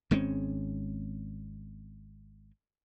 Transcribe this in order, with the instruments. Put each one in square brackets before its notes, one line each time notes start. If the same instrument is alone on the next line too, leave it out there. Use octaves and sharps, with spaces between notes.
[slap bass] G#1 G#3 C4 C#4